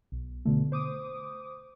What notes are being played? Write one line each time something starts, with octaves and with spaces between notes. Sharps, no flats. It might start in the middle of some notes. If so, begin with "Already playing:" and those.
B1
B2 D3 A3
C5 D6 D#6